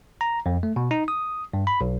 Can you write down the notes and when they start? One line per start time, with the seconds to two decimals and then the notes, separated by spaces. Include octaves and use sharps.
0.21 A#5
0.46 F2
0.63 A3
0.76 B2
0.91 D#4
1.08 D#6
1.54 G2
1.67 B5
1.81 B1